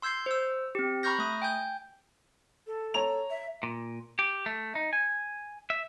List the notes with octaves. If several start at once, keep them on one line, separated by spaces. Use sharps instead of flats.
C6 E6 G6 G#6 C7
C5 E6
C4 G4
A#5 B5 C#6 F6 G6 A#6
A3 D#6
G5 G#5 G6
A4
C#5 A#5 F7
E5
A#2
G4
A3
D#4
G#5
E5